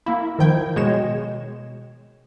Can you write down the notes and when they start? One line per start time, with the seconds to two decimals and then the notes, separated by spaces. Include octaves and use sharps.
0.06 A#3 E4
0.39 D#3 F3 G5 G6 G#6
0.76 B2 G#3 C#5 E7